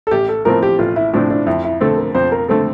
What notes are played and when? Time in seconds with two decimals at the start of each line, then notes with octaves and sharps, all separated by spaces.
0.07 A4
0.11 A1 G4
0.29 A4
0.45 A2 F3 A3 C4 A#4
0.63 G4
0.79 A1 F4
0.96 E4
1.13 A2 F3 A3 C4 D4
1.30 D4
1.46 F2 E4
1.64 E4
1.81 D3 A3 C4 A4
1.97 A#4
2.15 F2 C5
2.32 A#4
2.48 D3 A3 C4 A4